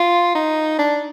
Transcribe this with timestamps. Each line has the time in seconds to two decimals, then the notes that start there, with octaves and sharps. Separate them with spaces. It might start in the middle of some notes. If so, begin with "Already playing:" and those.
Already playing: F4
0.35 D#4
0.78 D4